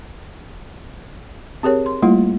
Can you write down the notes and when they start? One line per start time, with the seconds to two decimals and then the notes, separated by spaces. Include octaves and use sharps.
1.63 C4 G4 G#4 A#4 C#5
1.86 C6
2.02 G3 A3 A#3 E4 F4